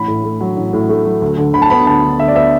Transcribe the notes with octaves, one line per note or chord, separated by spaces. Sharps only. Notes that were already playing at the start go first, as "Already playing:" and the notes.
Already playing: A1 B5
A2
A3
F#3
A1
A2
A3
F#3
D2
D3
D2 B5
A5
B3 B5
D2 A5
D3
D2 E5
D5
B3 E5